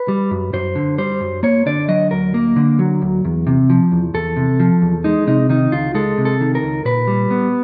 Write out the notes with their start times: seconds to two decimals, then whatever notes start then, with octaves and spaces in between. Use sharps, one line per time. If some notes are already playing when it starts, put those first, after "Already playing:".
Already playing: B4
0.08 G3
0.31 F#2
0.53 F#2 C5
0.75 D3
0.98 G3 C5
1.21 F#2
1.43 A#3 C#5
1.66 D3 D5
1.88 F#3 D#5
2.11 D2 A#4
2.34 A#3
2.56 D3
2.79 F#3
3.02 D2
3.25 E2
3.47 C3
3.70 F3
3.92 E2
4.14 E2 A4
4.36 C3
4.60 F3
4.82 E2
5.04 G#3 D#4
5.27 C3 D#4
5.49 D#3 D#4
5.72 C#2 F4
5.95 G#3 A4
6.18 C3
6.25 A4
6.41 D#3
6.55 A#4
6.63 C#2
6.85 A#2 B4
7.07 G3
7.30 B3